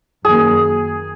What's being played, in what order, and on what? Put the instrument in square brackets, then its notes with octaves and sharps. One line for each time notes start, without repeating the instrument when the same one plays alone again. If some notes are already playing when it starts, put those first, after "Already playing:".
[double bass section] F#2 D#3 F#3 A#3 [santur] G#4